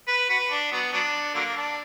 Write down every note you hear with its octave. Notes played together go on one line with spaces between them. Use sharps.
B4
F#4 B4
D4
F#3 B3
F#3 B3 D4
D3 F#3 A#3
D4